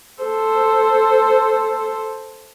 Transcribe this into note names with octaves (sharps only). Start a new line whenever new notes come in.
A4 C5